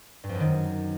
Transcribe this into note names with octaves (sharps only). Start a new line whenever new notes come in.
G2
F2
F#2
D#3